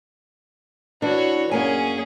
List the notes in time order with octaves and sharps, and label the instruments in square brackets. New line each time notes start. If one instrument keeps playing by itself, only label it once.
[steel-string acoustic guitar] E3 D4 [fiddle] F#4 C#5
[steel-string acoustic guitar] F#2 A#3 G#5 [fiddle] C#4 G#4